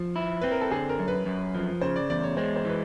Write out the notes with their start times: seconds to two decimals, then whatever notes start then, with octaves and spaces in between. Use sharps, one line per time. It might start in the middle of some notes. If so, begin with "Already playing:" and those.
Already playing: F3
0.16 E4
0.41 C4 B4
0.52 A#4
0.61 A4
0.71 D3 G#4
0.89 A#4
0.99 F#2
1.08 B4
1.26 F#2
1.55 F3
1.81 C#3 C5
1.96 D5
2.10 E2 D5
2.24 C#5
2.37 G#3 C5
2.56 C5
2.65 E3 B4